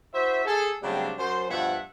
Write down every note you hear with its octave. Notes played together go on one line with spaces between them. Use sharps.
E4 F#4 C5 E5
G#4 A4
C#3 F#3 G3 A3 C4 D4
F#2 C5
G2 B2 F3 E5 F#5